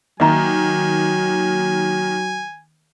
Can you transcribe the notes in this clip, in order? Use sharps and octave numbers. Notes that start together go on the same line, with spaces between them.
D#3 F#3 A#3 D#5 E5 G#5 A#5